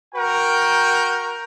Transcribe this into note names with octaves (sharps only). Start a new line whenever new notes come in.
F#4 A#4 G5